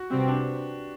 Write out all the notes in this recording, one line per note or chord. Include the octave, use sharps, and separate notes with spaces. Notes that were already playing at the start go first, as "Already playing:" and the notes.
Already playing: F#4
C3 G3 C4 G4
B4
D4